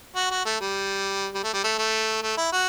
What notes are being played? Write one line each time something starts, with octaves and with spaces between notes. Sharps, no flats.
F#4
F#4
A3
G3
G3
A3
G3
A3
A3
A3
E4
F#4